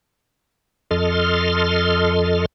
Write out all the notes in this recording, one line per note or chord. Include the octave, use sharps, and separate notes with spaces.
F2 A4 D#5 C6 F6